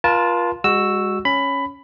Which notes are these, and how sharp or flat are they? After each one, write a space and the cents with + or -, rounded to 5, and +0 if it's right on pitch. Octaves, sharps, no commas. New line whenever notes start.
F4 +0 A#4 +45 A5 -10
G#3 -30 F#4 +0 E6 +0
C#4 +0 B5 +15